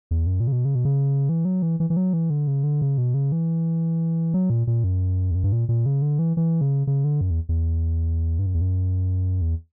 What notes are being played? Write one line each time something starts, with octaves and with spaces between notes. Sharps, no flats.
E2
F#2
A#2
C#3
B2
C#3
B2
C#3
E3
F#3
E3
E3
E3
F#3
E3
D3
C#3
D3
C#3
B2
C#3
E3
F#3
A#2
A#2
F#2
E2
F#2
G2
A#2
A#2
C#3
D3
E3
E3
C#3
C#3
D3
F#2
E2
E2
G2
F#2
E2
F#2
E2